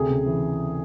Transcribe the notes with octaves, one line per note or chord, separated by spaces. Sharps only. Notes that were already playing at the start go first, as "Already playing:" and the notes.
Already playing: D2 C3 G#4
C#3
E3